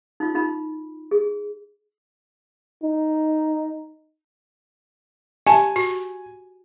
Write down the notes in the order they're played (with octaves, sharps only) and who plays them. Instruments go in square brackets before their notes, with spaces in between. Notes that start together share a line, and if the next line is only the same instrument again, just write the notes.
[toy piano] D#4 F4
D#4 F4 B5
G#4
[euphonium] D#4
[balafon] G4 A5 [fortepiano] G#5
[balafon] F#4